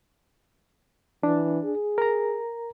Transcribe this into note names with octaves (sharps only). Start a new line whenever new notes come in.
E3 D4
G#4
A#4 A#5